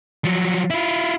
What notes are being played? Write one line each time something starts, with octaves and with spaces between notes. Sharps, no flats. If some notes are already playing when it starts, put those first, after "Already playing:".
F3 F#3
E4 F4